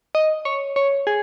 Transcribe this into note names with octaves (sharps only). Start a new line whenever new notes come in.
D#5
C#5
C#5
G#4